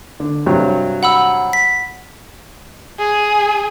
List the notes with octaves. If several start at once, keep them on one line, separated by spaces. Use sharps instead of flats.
D3
G2 C3 F#3
F#5 B5 E6
B6
G#4